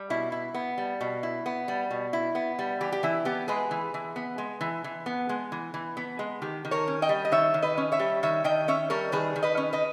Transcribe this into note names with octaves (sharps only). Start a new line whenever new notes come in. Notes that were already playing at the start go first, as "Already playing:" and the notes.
Already playing: G3
B2 E4
E4
B3
G3
B2
E4
B3
G3
B2
E4
B3
G3
E3 G4
G4
E3 E4
B3 G4
G#3 G#4 B4
E3
E3
B3
G#3
E3
E3
B3
G#3
E3
E3
B3
G#3
D#3 G4
D#3
A#4 C#5
C#4
D#5 G5
G3
D#5
D#3 C#5 E5
D#3
B4 D#5
C#4
C#5 E5
G3
D#3 C#5 E5
D#3 D#5 G5
C#4 C#5 E5
G3 A#4 C#5
D#3 G#4 B4
D#3
B4 D#5
C#4
B4 D#5